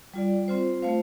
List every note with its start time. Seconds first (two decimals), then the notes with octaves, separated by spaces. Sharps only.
0.13 G3 F4 D5
0.48 C4 F4 C5
0.82 A3 F4 C5 F5